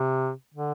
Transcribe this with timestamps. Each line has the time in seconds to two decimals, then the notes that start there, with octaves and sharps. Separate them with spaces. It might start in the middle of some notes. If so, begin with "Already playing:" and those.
Already playing: C3
0.54 D3